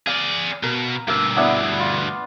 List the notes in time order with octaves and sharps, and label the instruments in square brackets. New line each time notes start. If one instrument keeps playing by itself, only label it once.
[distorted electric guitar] G#4 D5 [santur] F5
[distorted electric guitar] B2 [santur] A#4
[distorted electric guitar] D2 G2 [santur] A#3 F5 E6
[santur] B3 D4 E4
F4